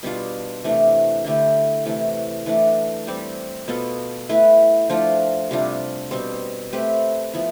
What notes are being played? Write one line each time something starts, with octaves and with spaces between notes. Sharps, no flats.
B2 G3 D4 F4
C3 E3 A3 D4
D3 A3 E4 G4
C3 E3 A3
E3 A3 D4
G3 C4 G4
B2 B3 F4 A4
A3 E4 B4
F3 A3 D4 F4
C3 G3 D4 F4
B2 G3 C4
A3 C4 G4 B4
F3 B3 E4